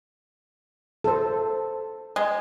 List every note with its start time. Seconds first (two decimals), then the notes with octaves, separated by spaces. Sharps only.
1.04 A4 C5
2.16 G#3